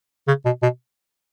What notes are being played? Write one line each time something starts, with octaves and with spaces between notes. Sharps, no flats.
C#3
B2
B2